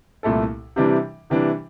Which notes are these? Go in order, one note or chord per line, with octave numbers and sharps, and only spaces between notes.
C2 A#2 A3 E4 A4
C3 E3 G3 D4
C3 E3 G3 D4